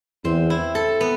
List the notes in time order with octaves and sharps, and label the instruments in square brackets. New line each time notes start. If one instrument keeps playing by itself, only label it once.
[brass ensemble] E2 [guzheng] C4
[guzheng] E4
A4
B3